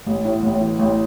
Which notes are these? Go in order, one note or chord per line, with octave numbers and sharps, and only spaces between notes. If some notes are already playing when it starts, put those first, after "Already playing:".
A1
A2
A1
E3
A1